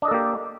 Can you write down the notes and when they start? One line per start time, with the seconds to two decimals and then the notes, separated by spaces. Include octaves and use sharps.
0.02 D4
0.05 D#5
0.08 A4
0.11 A#3
0.14 G4